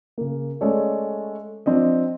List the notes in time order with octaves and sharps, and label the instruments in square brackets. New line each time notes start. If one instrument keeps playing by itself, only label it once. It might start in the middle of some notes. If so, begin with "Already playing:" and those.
[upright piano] C#3 A#3
G#3 A3 C#4 A4 C#5 D5
F3 C4 D4 D#5